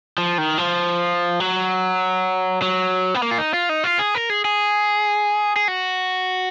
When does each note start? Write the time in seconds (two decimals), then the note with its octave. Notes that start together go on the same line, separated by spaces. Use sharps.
0.18 F3
0.38 D#3
0.58 F3
1.40 F#3
2.62 F#3
3.15 B3
3.23 A#3
3.31 F4
3.38 D#4
3.54 F4
3.69 D#4
3.84 F4
3.99 G#4
4.15 A#4
4.30 G#4
4.45 G#4
5.56 G#4
5.68 F#4